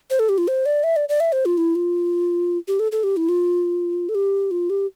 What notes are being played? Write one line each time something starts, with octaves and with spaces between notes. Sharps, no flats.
C5
A4
G4
F4
C5
D5
E5
D5
D5
E5
C5
F4
E4
F4
G4
A4
A4
G4
E4
F4
A4
G4
F4
G4